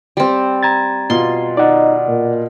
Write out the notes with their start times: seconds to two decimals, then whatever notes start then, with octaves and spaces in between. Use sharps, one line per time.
0.17 G3 C4
0.63 A#5 G#6 A6
1.10 B2 F4 C6
1.57 D#4 D5 F#5
2.08 A#2